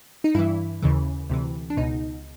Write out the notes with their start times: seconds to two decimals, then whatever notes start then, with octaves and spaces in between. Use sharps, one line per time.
0.24 D#4
0.35 G2 E3 E4
0.82 D#2 C#3 E3
1.29 D2 C3 E3
1.70 D4
1.77 C#2 B2 D#4